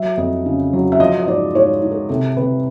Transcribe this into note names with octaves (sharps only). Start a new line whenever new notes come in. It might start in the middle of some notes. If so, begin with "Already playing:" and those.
Already playing: F#3 E5
F2 D#5
C#3
F#3
E5
F3 D#5
D#5
G#2 D5
G#2 C#5
G#2
A#4
C3 A4
C3 B4